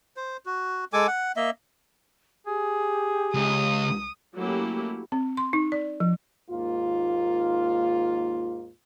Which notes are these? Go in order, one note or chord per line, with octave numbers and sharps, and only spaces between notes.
C5
F#4
G#3 A4 G#5 D6
F#5
A#3 D#5 E5
G4 G#4
C#2 D#6
F#3 A3 A#3 C#4 E4 G4
C4
C6
D#4
D5
F3
D#2 G#2 A#3 F4